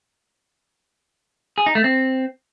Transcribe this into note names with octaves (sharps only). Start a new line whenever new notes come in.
G#4
D#4
A3
C4